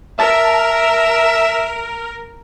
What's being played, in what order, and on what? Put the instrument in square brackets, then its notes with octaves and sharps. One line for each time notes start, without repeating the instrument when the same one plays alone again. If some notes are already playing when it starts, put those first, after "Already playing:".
[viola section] A#4 [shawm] E5 [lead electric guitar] A5